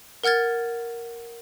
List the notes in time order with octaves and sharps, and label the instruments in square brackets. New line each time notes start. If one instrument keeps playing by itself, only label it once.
[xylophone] A#4 F#5 F6 G#6 A6